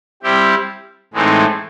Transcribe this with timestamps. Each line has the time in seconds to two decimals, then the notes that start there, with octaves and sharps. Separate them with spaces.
0.23 G3 C4 E4 G4
1.14 A2 E3 G#3 C4 D#4